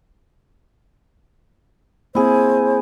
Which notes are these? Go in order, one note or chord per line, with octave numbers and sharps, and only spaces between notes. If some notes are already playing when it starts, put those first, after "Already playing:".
A#3 C4 E4 G#4 C5